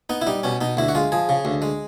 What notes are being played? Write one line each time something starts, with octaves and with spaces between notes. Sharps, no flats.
B3 D#4
E4
G3 D#4
B2 C#4
B2 D#4
D2 E4
F#4
G#3 F4
F3 G#4
C#3
D2
G#3